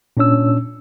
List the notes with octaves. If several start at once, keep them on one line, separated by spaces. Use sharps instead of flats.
A#2 C#4 D4 C#5 E6